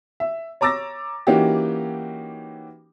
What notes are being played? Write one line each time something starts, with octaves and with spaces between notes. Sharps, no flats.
E5
C#5 A#5 D6 E6 A6 A#6
E3 A#3 C#4 D#4 F#4 G4